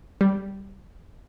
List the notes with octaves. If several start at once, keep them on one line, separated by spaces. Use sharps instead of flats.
G3